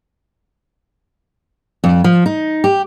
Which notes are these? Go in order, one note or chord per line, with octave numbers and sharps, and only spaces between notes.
F2
F3
D#4
G4